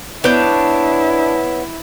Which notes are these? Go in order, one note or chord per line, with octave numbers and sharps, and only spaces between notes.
B3 D4 E4 C#5 G6